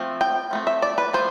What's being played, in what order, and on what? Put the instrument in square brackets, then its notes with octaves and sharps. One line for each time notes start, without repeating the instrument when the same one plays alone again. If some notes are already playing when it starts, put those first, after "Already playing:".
Already playing: [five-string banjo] F3 A3 C4
G5
F3 A3 C4
E5
D5
B4
F3 A3 C5